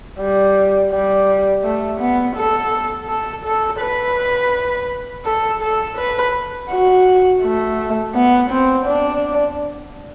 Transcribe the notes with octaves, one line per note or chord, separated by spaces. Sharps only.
G3
G3
A3
B3
A4
A4
A4
B4
A4
A4
B4
F#4
A3
B3
C4
D4